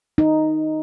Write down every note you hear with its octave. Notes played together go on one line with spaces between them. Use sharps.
D#4